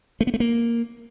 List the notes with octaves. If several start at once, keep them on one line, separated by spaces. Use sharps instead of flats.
A3
B3
A3
A#3